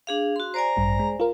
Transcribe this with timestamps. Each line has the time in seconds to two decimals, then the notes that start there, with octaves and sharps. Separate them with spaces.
0.07 D4 G#4 F5
0.36 F#4 C6
0.54 C5 D5 G#5 A#5
0.77 A1 G2
0.99 G#3
1.20 F4 A#4